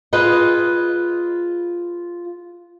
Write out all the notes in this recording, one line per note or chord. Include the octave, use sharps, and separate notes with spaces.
F4 G#4 B4 C5 D#5